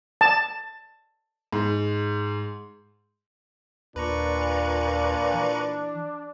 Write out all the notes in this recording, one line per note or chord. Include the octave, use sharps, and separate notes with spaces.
A5
G#2
D#2 A#2 D4 B4 A#5 C#6
E3